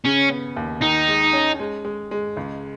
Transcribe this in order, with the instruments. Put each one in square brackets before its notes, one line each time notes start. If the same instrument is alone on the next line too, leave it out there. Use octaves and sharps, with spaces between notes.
[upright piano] C#3 [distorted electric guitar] C#4
[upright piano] B3
D#2
[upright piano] D#3 [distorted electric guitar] D#4
[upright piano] G#3
C#4
G#3
G#3
G#3
C#2